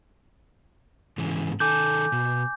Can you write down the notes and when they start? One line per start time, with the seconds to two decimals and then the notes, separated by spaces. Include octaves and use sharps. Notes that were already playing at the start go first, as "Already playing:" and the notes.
1.18 G#2 C#3 E3
1.60 D#3 A4 G#5 D6 G6
2.12 B2